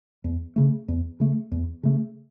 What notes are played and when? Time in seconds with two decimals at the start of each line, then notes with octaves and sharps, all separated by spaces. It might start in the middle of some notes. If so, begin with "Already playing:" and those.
0.24 E2
0.56 C#3 A3
0.88 E2
1.20 C#3 A3
1.52 E2
1.83 C#3 A3